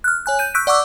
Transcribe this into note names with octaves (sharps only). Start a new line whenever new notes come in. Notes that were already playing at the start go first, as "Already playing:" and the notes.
F6 F#6
C#5 G#5 F#6
G6 D#7
C#6 E6 F#6 G6 B6 D7
D5 F#5 C#6 D6 E6